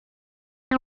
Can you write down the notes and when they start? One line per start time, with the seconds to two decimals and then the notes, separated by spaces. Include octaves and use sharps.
0.71 C4